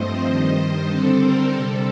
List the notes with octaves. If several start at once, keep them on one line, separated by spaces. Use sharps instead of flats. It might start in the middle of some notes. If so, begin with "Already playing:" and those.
Already playing: G2 F3 A3 C4 C5 D#5
G2 D#3 G3
D3 G3 C4 A4 C5
A#4
C3 G3 C4 A4